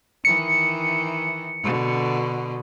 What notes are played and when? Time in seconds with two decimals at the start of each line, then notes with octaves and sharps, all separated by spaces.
0.25 D#3 E3 C#7
1.63 B2 D3